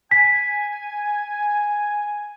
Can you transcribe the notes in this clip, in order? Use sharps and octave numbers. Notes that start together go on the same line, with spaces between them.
G#5 B6